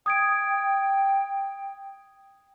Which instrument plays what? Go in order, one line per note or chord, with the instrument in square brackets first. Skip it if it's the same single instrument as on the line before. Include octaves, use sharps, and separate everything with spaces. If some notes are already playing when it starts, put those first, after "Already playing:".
[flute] G5 [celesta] D#6 G#6 D7